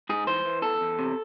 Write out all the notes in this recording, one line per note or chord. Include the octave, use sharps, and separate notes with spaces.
G#2 G#4
E3 C5
E3
E2 A4
E2
C3